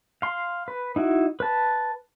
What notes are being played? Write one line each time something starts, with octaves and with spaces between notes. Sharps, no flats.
F5 C6
B4
D#4 E4 F#4
B4 A5